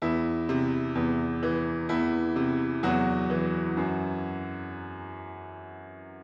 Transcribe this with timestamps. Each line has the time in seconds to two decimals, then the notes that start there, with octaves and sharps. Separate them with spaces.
0.02 E2 E4
0.49 C3
0.95 E2
1.43 E3
1.89 E2 E4
2.36 C3
2.83 E2 F#3 F#4
3.30 E3
3.77 F#2